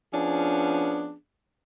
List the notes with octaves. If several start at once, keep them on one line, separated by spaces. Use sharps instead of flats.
F3 B3 C#4 D4 G#4